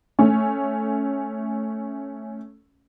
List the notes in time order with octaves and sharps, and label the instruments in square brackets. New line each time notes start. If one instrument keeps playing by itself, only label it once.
[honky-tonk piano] A3 C#4